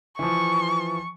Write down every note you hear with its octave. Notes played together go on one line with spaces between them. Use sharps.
E3 F3 C#6